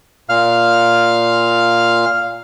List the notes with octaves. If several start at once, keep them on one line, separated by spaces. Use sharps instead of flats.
A#2 F5 F6